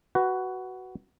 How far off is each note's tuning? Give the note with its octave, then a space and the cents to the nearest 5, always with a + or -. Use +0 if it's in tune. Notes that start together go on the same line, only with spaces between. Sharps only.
F#4 +10 B4 +0